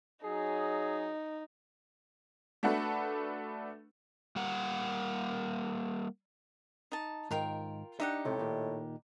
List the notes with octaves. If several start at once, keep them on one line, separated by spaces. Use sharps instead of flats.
F#3 D#4 G#4
A3 D4 F#4 A4 B4
G3 A#3 F#5
D#4 A5
G#2 D#3 F4 A#4 G5
D4 D#4 G4 E5 F#5
C#2 A2 C3
A#2 D#3